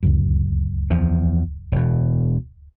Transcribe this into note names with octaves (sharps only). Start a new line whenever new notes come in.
D1 C#2 F#2
E2 F3
E1 B2